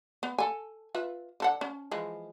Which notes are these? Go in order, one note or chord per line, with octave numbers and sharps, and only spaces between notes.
B3
A4 G#5
F4 B4 E5
D3 A4 F#5
C#4
E3 F3 G#3